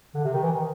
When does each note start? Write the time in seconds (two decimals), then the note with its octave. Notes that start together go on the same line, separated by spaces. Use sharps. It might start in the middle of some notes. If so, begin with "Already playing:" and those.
0.15 D3
0.24 C3
0.34 D#3
0.43 E3
0.53 D#3